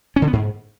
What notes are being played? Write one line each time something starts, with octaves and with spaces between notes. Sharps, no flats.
C#4
D3
B3
G#2